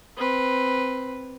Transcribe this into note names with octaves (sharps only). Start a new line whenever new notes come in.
C4 B4